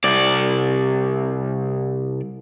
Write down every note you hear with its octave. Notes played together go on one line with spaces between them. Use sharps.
C2 D5